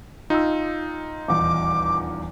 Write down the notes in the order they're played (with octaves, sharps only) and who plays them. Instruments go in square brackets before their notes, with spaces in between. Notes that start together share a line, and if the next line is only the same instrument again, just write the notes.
[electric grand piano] D#4 F4 [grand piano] G5 E6
[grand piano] D#1 E2 [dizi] D6